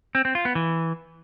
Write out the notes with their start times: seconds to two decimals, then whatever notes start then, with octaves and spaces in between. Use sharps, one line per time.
0.15 C4
0.25 C4
0.35 F4
0.45 B3
0.55 E3